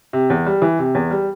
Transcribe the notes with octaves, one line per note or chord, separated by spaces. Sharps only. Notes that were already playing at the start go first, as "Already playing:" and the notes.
C3
E2
G3
E3
C3
E2
G3